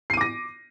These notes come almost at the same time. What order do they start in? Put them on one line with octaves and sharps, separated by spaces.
C7 D#7 D6 A#6